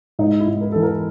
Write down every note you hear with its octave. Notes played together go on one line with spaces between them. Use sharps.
G#2 D#4
E4
G#2
A#4
E3 A4
A#4